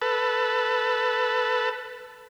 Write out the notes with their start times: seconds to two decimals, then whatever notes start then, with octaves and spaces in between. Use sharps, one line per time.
0.02 A4 B4